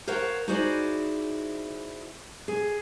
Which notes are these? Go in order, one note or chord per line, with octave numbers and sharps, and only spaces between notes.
A#4 C5 C#5 F5 F#5 A#5
D#4 E4 F#4 G#4 C5 D5
G#4